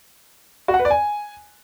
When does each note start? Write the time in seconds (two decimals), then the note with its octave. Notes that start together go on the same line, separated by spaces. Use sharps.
0.68 F#4
0.74 F#5
0.79 B4
0.85 D5
0.91 G#5